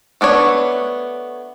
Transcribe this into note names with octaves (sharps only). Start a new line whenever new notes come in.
A3 B3 D4 C#5